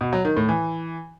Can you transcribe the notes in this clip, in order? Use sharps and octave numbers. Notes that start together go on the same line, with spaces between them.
B2
F#3
D#3
A2
E3